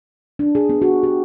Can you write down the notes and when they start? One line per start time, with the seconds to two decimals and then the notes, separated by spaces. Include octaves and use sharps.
0.39 D4
0.55 G#4
0.69 B3
0.82 F#4
1.03 G4